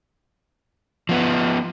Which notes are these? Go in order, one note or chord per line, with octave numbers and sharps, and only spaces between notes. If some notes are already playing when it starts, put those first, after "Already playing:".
F3 B3